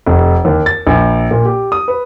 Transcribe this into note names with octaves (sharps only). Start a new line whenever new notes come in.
F1
D#2
A6
A#1
A#2
G4
D#6
B4